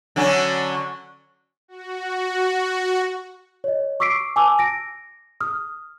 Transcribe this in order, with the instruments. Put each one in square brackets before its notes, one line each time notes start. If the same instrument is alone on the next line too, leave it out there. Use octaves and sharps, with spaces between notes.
[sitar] D3 F#3 C#4
[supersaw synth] F#4
[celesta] C#5 D#5
C#6 D6 E6 B6 C7 D7
G#5 A5 D6 E6
A#6 D7
D#6 F6